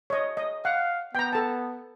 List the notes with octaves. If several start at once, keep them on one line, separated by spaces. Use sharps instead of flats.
C#5 D#5
D#5
F5 F#5
B3 G5 A#5
A4 A5